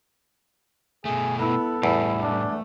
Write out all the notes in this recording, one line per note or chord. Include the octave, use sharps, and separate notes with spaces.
B2 A3 G#4
B3 E4 A4
E2 A2 G3 E4
A3 D4